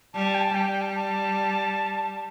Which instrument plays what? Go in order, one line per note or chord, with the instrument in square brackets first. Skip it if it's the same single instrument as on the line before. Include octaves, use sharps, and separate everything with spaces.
[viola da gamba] G3 [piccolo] A5
[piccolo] A5
G5
A5
[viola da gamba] G3 [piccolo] G5
[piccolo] G5
A5
A5